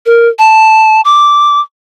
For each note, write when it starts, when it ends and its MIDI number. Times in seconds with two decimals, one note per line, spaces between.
0.06 0.28 70
0.39 1.01 81
1.05 1.60 86